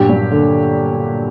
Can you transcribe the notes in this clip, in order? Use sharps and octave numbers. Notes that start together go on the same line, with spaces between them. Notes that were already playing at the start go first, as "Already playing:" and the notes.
Already playing: G2 A#2 F#3 G4
G3
D3